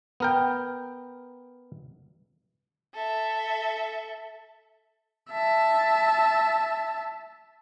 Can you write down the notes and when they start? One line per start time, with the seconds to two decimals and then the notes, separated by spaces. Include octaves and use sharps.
0.20 B3 A#4 G5
2.94 A4 E5
5.31 E5 A5